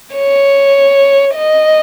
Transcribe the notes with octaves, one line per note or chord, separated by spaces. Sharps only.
C#5
D#5